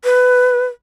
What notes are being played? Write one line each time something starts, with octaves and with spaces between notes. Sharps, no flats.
B4